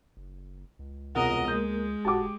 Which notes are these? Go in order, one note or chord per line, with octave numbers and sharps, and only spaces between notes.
F#1
C#2
E1 C2 F4 A#4 D#5 F#5
G#3 A#3 A#4 G6
F1 G#2 F#4 G4 A5 D6